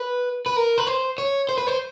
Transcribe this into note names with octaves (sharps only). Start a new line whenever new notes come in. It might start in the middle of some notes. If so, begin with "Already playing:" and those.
Already playing: B4
B4
A#4
B4
C5
C#5
C5
B4
C5